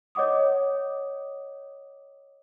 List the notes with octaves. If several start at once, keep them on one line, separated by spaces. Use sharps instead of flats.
C#5 D#5 F#5 D6 D#6